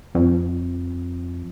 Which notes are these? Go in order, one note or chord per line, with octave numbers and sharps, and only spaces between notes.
F2